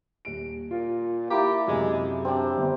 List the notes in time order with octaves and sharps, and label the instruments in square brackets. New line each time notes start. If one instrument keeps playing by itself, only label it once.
[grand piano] D#1 D7
[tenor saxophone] A#2 [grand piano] F4
[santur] A#3 E4 D5 [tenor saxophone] G4 [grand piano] D6
[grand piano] F#2 C3 [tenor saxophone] G#3
[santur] C4 G4 [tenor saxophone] D4
[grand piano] G1